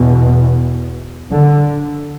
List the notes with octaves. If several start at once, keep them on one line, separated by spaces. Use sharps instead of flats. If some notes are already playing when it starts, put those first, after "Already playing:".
Already playing: E2 B2
D3